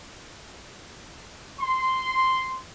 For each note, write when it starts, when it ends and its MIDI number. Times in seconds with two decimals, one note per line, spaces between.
1.60 2.60 84